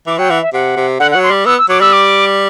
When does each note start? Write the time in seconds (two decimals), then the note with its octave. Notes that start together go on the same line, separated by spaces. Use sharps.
0.07 E3 D6
0.18 F#3 G5
0.30 E3 F#5
0.42 E5
0.53 C3 F#5
0.77 C3
0.99 D3 F#5
1.11 F#5
1.15 F#3
1.23 C6
1.31 G3
1.46 B3 E6
1.58 E6
1.69 F#3 D6
1.81 G3 E6
1.93 D6